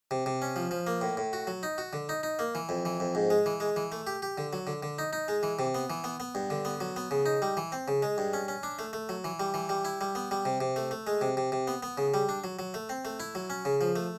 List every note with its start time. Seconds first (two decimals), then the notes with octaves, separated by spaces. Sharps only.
0.11 C3
0.26 C3
0.42 C#4
0.56 F3
0.71 F3
0.87 A#3
1.01 A2
1.17 A2
1.33 F#4
1.47 F#3
1.63 D#4
1.78 F#4
1.93 D3
2.09 D#4
2.23 D#4
2.39 A#3
2.55 E3
2.69 F2
2.85 E3
3.00 F2
3.15 G#2
3.30 G#3
3.46 E3
3.60 G#3
3.76 E3
3.92 A3
4.07 G4
4.22 G4
4.38 D3
4.53 F#3
4.67 D3
4.83 D3
4.98 D#4
5.13 D#4
5.28 G#3
5.43 E3
5.59 C3
5.75 B3
5.90 E3
6.04 B3
6.20 B3
6.35 G2
6.50 D3
6.65 B3
6.81 F#3
6.96 B3
7.11 C#3
7.26 D#4
7.42 G3
7.57 E3
7.72 C4
7.88 C#3
8.02 G#3
8.18 G2
8.33 C#4
8.48 C#4
8.63 D4
8.79 A3
8.93 A3
9.09 F#3
9.24 E3
9.40 G3
9.54 E3
9.69 G3
9.85 E4
10.01 G3
10.15 B3
10.31 G3
10.45 C3
10.61 C3
10.76 A3
10.91 A3
11.07 G#3
11.21 C3
11.37 C3
11.52 C3
11.67 B3
11.83 B3
11.98 C#3
12.14 G3
12.29 D4
12.44 F#3
12.59 F#3
12.74 A3
12.89 C4
13.05 A3
13.20 E4
13.35 F#3
13.50 C#4
13.65 C#3
13.81 F3
13.96 A3